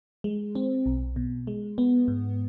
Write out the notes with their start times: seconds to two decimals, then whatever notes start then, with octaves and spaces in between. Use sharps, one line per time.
0.24 G#3
0.55 C4
0.86 B1
1.16 B2
1.47 G#3
1.78 B3
2.08 G#2